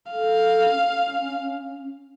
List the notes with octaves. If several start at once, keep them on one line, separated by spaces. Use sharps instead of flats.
A4 F5
C#4